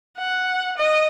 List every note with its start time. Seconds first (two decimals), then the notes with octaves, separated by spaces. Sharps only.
0.19 F#5
0.78 D#5